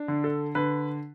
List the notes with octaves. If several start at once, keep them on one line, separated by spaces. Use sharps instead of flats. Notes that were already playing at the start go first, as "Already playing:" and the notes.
Already playing: D4
D3
A4
D3 B4